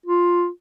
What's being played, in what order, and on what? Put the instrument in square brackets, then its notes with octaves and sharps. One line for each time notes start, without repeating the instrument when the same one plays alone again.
[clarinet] F4